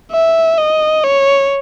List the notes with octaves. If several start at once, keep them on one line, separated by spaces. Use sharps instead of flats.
E5
D#5
C#5